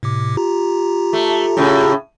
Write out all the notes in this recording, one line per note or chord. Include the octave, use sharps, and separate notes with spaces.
A2 C3 D6
F4 G4 A#5
A3
A2 C#3